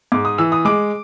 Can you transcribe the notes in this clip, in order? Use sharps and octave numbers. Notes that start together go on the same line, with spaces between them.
G#2 D6
D#6
E3 E6
D#6
G#3 D6